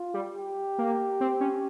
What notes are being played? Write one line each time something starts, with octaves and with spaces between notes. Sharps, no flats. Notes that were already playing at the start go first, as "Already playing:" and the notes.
Already playing: F4
G3
G4
A#3
C4
C#4